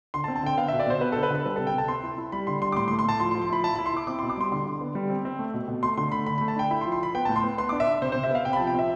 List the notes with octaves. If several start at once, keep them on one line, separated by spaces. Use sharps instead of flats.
D3 C6
A5
C4
A5
D3 G5
B3 F5
B2 E5
D5
B2 C5
B3 B4
D3 A4
B4
D3 A4
G3 B4
C3 A4
G5
C3 A5
C4 C6
E4
E4
G3 B5
D3 C6
G3 C6
D6
A2 C6
C6
A3
C6
A2 A5
F3 C6
C6
F3
C6
E4 B5
E4 A5
E4 B5
C6
E4 D6
C4 D6
B2 C6
D6
G3 C6
D3 C6
D3
B3
G3
C4
C4
A3
B2
B2
A3 C6
D3 C6
A3 B5
D3 B5
A3 B5
A5
D4 G5
E4 B5
C6
F3
C6
F3 B5
B3 G5
A2 A5
C6
B3
B3 C6
D4 D6
E5
D4
C3 C5
C3 C5
E5
B3 F5
C3 G5
B5
F3 A5
G5
C4 E5